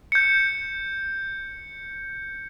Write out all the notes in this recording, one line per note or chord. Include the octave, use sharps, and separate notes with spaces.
G6 C#7